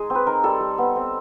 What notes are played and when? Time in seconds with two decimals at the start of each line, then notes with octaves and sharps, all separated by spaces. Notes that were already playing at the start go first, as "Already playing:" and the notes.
Already playing: G#3 D#4 G#4
0.10 C4
0.15 B4
0.26 D#4 A#4
0.44 G3 A4
0.60 G3
0.78 B3
0.96 C4